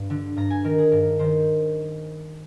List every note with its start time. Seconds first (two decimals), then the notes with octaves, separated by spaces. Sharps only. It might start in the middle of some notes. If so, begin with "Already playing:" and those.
Already playing: G2
0.10 D3
0.36 G2 A#5
0.50 G#5
0.64 D#3 A#4
0.78 G#4
0.91 G2 A#4
1.19 D#3 C5